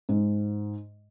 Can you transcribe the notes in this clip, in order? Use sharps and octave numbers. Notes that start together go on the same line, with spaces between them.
G#2